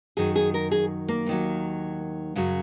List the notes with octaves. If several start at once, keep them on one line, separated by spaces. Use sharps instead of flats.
F#2 D#3 F#3 G#4
G#4
A#4
G#4
A#3
D#2 D#3 F#3
F#2 C#3 F#3